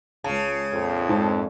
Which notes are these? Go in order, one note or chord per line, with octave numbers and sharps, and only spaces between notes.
C#2 C#3 A5
A#1 F2
G#2 C4 A5